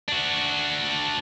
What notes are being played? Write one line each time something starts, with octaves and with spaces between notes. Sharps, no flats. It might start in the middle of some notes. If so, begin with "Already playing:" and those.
D4 F#4